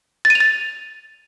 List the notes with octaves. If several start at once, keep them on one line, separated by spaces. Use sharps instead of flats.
A6
D#7
F7
A6